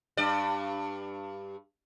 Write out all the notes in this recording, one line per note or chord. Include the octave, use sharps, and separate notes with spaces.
G2 D5